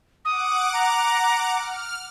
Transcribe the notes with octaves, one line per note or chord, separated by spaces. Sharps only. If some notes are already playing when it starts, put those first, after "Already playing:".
F#5 D6 D#6
A#5
F6